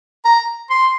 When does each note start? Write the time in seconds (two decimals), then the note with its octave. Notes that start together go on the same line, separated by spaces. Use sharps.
0.25 A#5
0.71 C6